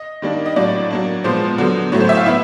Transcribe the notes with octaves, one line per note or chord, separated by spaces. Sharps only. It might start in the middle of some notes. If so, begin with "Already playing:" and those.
Already playing: D#5
D#3 G3 A#3 D4
D#5
A2 F#3 A#3 D4 D5
F#3 A#3 D4
A#2 F3 G#3 B3 C5
D3 F#3 B3
A2 F#3 A3 C#5
C5
E5
F5
B3 E4 E5